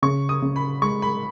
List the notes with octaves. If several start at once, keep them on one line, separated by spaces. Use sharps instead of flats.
C#3 C#6
D#6
C#3
B5
G#3 C#6
B5